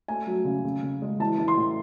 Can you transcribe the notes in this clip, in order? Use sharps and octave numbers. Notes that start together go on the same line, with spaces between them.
A3 G#5
F#3
C#3
C#3
C#3
G#3
E3 A5
E3
C6
A2